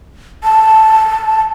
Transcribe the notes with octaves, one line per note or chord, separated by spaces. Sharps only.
A5